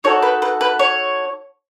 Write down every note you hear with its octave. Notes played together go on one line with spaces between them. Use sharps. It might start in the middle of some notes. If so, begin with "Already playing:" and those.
D#4 F#4 A4 C#5
B4
B4
B4
C#5